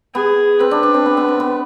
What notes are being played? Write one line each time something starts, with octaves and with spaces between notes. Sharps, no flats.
B3 G#4
C4 B4
D4
D4
C4
B3
B3
C4
B3